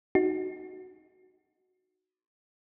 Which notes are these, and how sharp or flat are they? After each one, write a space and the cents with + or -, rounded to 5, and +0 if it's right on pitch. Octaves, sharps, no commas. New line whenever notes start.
D#4 +0 F#4 +0